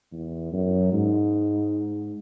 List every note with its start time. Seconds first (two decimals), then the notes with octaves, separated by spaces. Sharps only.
0.12 E2
0.53 F#2
0.93 G#2